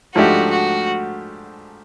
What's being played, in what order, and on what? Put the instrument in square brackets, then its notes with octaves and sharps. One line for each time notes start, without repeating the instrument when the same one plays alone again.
[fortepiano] G#2 F3 A3 D4 G4 [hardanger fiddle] F#4
[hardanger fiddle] F#4